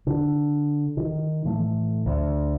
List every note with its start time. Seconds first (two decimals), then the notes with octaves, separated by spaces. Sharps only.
0.07 D3
0.97 D#3
1.45 A2 E3 A3
2.06 D2